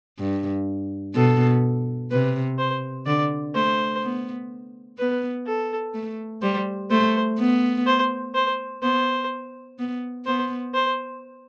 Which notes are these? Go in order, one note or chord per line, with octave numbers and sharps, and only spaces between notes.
G2
B2 A4
C3 B4
C5
D3 D5
A3 C5
B3
B3 B4
A4
A3
G3 C5
A3 C5
B3
C5
C5
B3 C5
B3
B3 C5
C5